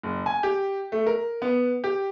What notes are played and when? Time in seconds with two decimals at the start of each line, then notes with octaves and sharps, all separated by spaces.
0.03 F#1
0.26 G#5
0.43 G4
0.92 A3
1.06 A#4
1.42 B3
1.84 G4